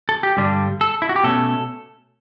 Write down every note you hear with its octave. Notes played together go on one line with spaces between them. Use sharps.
A4
G4
G2 D3 G3 D4
A4
E4
F#4
G4
B2 A3 C#4 A4